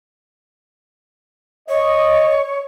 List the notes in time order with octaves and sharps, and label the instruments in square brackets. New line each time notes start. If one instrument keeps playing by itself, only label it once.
[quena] C#5 [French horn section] D#5